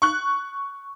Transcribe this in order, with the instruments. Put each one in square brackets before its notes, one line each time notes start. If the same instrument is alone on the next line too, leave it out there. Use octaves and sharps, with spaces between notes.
[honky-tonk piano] C#6 F#6